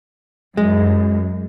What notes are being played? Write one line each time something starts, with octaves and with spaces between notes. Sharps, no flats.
F#2 G#3